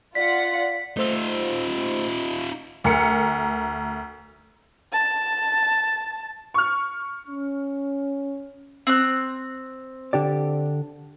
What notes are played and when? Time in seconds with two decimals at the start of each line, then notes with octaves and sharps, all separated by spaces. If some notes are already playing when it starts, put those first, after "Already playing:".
0.15 F4 D5 F#5 B6
0.97 A3 D#4 F4 C5 E6
2.84 D2 A#4 C#7
4.93 A5
6.54 C#6 F6
7.27 C#4
8.87 C4 F#6
10.13 D3 G4 D5